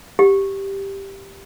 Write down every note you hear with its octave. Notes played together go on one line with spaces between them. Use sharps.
G4